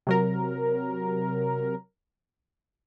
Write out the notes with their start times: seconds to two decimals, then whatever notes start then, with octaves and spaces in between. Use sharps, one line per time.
0.07 C3 F#3 A#4